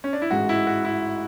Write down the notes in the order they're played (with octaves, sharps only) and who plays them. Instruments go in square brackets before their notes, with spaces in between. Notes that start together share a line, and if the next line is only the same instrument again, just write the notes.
[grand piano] C#4
D4
E4
[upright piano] A1 G#2 G#3 [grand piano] F#4
[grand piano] E4
F#4
E4